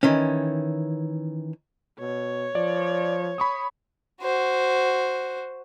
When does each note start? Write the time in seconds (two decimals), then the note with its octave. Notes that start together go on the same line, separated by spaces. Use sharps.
0.03 D#3 E3 C#4
1.99 B2 C#5
2.55 F3 D5
3.38 B5 C#6 D#6
4.21 F#4 C5